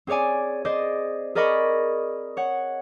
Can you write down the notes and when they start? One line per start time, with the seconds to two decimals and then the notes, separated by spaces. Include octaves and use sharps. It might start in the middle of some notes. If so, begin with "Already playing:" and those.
0.07 C4 G#4 C#5 D5 G#5
0.65 G#4 C5 D5 D#5
1.35 G#4 A#4 D5 D#5 B5 C#6
2.37 C#5 F#5